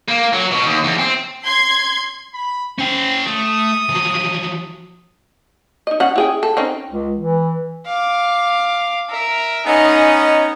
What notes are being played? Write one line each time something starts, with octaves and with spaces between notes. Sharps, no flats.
A#3
F#3
B2
D#2
E2
C4
C6 G#6
B5
C#4 C5 G5
A3 D#6
F3 F#3
D#4 D#5
C#4 F#5
E4 G#4 G5
A4
C4 C#4 D#4
C#2
E3
F5 D6
A#4 E5
B3 C#4 D#4 G#4 D#5